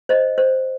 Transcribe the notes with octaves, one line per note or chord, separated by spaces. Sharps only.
C5 D#5
C5